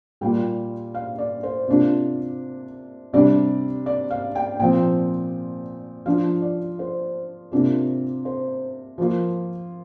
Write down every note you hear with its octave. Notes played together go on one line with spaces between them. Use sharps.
A#2 G3 A#3 F4 G5
F5
D5
C5
C3 A#3 D4 F4
C3 G3 D4 D5
D5
F5
G5
A#2 F3 C4 G5
F3 D4 F4 F5
D5
C5
C3 A#3 D4 F4
C5
F3 A#3 F4